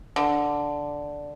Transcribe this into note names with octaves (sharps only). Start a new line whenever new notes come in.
D3